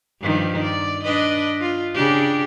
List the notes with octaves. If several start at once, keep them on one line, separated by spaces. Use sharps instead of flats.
G2 D#3 F3
D5
D4 B4 D#5
F4
C#3 D4 G4